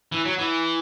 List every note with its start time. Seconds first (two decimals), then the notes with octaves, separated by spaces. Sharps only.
0.12 E3
0.25 F#3
0.39 E3